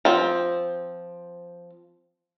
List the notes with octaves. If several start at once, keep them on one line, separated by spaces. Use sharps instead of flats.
F3 C4